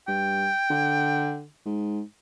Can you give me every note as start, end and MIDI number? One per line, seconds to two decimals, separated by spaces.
0.08 0.49 43
0.08 1.38 79
0.70 1.45 50
1.66 2.01 44